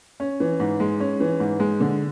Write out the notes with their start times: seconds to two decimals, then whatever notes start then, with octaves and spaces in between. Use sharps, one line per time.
0.20 C#4
0.40 E3
0.60 G#2
0.80 G#3
1.00 C#4
1.20 E3
1.40 G#2
1.60 G#3
1.80 D3